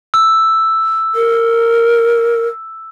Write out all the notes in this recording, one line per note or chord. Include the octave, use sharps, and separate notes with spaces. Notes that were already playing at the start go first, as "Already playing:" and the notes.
E6
A#4